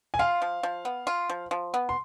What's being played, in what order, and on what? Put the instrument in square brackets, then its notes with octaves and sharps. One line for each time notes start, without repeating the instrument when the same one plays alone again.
[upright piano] G#5
[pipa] F4 [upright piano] F5
[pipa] F3
F3
B3
F4
F3
F3
B3
[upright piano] C6